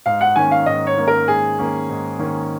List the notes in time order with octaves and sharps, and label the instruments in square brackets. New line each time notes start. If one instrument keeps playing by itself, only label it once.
[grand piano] G#2 [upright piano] F5
[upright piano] F#5
[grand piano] D#3 A#3 C#4 [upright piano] G#5
[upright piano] F5
[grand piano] G#2 [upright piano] D#5
[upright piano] C#5
[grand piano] D#3 A#3 C#4
[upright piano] A#4
[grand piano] G#2 [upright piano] G#4
[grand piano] D#3 A#3 C#4
G#2
D#3 A#3 C#4